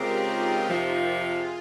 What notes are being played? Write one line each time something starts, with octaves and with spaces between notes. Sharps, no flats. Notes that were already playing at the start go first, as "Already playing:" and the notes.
Already playing: C#3 G#3 C4 F4 G4 A#4
D#4
F2 C3 F3
F4
G#4